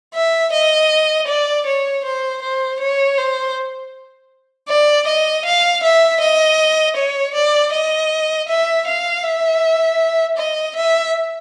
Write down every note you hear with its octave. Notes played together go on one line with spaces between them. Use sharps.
E5
D#5
D5
C#5
C5
C5
C#5
C5
D5
D#5
F5
E5
D#5
C#5
D5
D#5
E5
F5
E5
D#5
E5